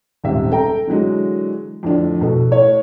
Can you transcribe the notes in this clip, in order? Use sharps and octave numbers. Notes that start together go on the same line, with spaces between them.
D#1 G#2 C3 E5
A4 G5 A#5
D3 E3 F#3 G#3
F2 A2 D3 D4
B2 A4
A2 C#5